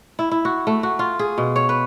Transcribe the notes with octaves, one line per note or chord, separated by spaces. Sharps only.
E4
E4
F#4
A3
F#4
F4
G#4
B2
C#5
B4